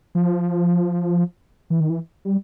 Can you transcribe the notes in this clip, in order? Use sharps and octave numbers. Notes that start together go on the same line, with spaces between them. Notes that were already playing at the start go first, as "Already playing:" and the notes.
F3
E3
D#3
E3
G3